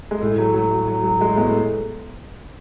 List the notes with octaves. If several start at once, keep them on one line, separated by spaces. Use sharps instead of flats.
G#3
A2 A3
F#3 A3
F#3
F#3
F#3
F#3
F#3 G#3
A3
A2 G#3 B3
A3